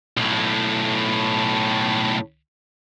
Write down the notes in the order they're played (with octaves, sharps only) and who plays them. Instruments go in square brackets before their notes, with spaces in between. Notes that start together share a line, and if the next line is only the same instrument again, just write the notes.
[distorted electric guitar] B1 A2